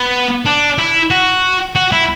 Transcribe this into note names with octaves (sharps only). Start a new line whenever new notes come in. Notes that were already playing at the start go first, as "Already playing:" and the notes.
Already playing: B3
D4
E4
F#4
F#4
E4